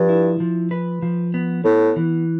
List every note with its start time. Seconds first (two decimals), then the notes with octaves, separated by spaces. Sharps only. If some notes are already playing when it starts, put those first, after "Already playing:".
Already playing: G2 F3
0.09 E4
0.40 F3
0.71 B4
1.02 F3
1.34 B3
1.65 A2 B3
1.96 E3